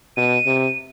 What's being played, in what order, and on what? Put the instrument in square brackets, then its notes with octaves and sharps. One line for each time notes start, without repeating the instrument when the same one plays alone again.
[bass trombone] B2 [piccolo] D#7
[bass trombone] C3